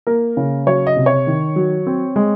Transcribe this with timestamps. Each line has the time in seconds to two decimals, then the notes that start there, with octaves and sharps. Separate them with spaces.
0.07 A#3 A#4
0.37 C#3
0.67 F#3 C#5
0.87 D#5
0.97 C3
1.06 C#5
1.27 D#3
1.56 F#3
1.87 C4
2.16 G#3